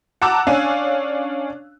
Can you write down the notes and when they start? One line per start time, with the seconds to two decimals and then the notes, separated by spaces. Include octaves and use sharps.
0.22 F#5 A5 A#5 D6 E6 F#6
0.47 C#4 D4 F5 G#5